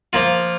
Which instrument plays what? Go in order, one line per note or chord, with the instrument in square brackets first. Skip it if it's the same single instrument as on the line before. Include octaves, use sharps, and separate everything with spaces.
[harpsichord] F3 A#3 F4